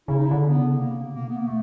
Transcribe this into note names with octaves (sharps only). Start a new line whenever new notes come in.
C#3 E4
D#4
E4
D3
B3
C#3
C3 A#3
B2 A#3
B3
A#3
A3